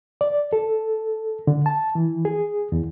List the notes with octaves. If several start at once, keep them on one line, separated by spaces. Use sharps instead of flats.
D5
A4
D3
A5
E3
G#4
E2